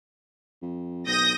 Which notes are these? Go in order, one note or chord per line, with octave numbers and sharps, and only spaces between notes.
F2
B1 D#6 G6 A#6